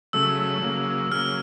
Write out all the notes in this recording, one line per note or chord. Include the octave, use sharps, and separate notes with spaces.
C#3 F#3 A3 E6
C#3 F#3 A#3
C#3 F#3 A#3 F6